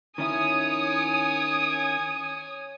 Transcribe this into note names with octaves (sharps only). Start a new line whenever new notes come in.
D#3 C#4 E4 C#5 G#5 D#6